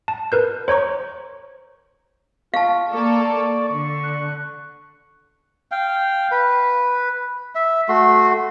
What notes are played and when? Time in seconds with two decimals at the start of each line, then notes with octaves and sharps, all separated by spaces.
0.08 A5
0.32 A#4 B4 G6
0.68 C5 C#5 A#5 C#6
2.54 F4 F5 A5 C#6
2.91 A#3 A4 D5
3.68 D3 C#6
4.03 F#6
5.71 F5 G5
6.31 B4
7.55 E5
7.89 A3 F#4 C6